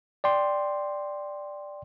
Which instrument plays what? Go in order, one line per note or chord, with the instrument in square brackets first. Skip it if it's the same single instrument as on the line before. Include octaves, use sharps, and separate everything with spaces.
[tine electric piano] D5 G5 C6